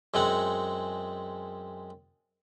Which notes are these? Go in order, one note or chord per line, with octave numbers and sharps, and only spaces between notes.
F#2 G#3 C4 F#5